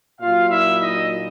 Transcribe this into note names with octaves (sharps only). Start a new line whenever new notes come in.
A#2 F#3 F4 F5
E4 E5
D#4 D#5